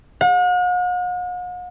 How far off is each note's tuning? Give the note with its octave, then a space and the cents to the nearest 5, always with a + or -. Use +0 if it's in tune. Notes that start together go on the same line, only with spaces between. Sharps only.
F#5 -45